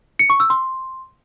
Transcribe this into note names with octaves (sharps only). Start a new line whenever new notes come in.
C#7
C#6
E6
C6